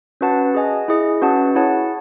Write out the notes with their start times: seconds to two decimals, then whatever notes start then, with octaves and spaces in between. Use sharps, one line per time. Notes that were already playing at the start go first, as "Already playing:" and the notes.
0.21 C#4 F#4 B4 F#5 A5
0.54 G#4 D#5 G#5
0.88 E4 G#4 D#5
1.22 C#4 F#4 B4 F#5 A5
1.55 E4 G#4 C#5 F#5 A5